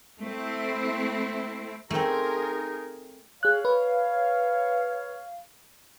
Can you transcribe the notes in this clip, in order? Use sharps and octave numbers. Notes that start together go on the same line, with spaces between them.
A3 C4 E4
A3 C4 D#4 G#4 A#4
G#4 C#5 F5 F#6
B4